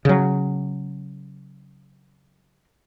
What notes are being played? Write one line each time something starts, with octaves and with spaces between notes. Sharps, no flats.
C#3 F#3